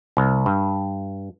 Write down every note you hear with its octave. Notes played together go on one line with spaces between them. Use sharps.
C2
G2